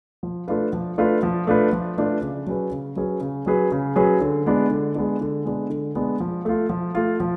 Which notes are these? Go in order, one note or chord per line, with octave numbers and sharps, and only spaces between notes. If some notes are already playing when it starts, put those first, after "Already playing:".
F3
A3 D4 F4 B4
F3
A3 D4 F4 B4
F3
A3 D4 F4 B4
F3
A3 D4 F4 B4
C#3
F#3 C#4 G#4 B4
C#3
F#3 C#4 G#4 B4
C#3
F#3 C#4 G#4 B4
C#3
F#3 C#4 G#4 B4
D3
G#3 B3 D4
D3
G#3 B3 D4
D3
G#3 B3 D4
D3
G#3 B3 D4
F3
A3 F4
F3
A3 F4
F3